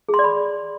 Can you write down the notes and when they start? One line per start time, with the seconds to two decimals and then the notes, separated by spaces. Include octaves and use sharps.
0.09 G#4
0.14 C6
0.19 D5
0.24 B5